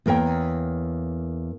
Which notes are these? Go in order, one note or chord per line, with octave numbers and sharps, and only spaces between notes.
E2 A#3 A#4 C#5 G5